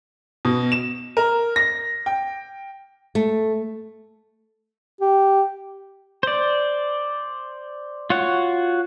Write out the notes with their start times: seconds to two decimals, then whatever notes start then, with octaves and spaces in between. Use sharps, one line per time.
0.45 B2
0.72 E7
1.17 A#4
1.56 A#6
2.06 G5
3.15 A3
5.01 G4
6.23 C5 D5
8.10 F4 F#4 C#5 F#5